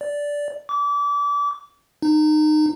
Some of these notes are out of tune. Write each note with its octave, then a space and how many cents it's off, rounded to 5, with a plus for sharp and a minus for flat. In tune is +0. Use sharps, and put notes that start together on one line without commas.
D5 -10
D6 -30
D#4 -25